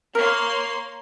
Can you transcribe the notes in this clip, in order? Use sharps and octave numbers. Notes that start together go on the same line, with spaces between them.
A#3 A#4 C#5 C6